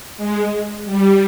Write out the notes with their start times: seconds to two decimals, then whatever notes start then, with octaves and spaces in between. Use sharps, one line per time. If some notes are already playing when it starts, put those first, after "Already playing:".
0.17 G#3
0.85 G3